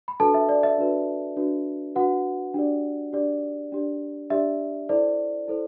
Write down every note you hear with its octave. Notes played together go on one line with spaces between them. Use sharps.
B5
D4 F#4 A4 B4 A5
E5
D5
E5
D4 F#4 B4
D4 F#4 B4
D4 F#4 B4 F#5
D4 G4 D5
D4 G4 D5
D4 G4 D5
D4 G4 D5 E5
E4 A4 C5 D5
E4 A4 C5